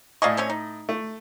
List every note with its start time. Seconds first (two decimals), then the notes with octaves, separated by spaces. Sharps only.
0.22 A2 D5 D#5 F5 G#5 C#6
0.37 C4 C#4 C#5
0.50 D#4
0.89 A3